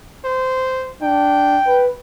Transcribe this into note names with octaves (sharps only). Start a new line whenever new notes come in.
C5
D4 G5
B4